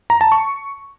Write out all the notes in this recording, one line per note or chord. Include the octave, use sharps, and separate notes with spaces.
A#5
A5
C#6